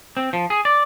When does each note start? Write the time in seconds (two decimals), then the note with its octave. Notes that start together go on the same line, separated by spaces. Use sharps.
0.17 C4
0.33 F3
0.50 G#4
0.65 D5